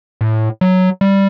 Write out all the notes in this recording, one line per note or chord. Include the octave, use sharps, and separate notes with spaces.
A2
F#3
G3